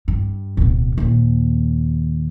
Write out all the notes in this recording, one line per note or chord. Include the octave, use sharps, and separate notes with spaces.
G2
D1 B2
D#2 A#2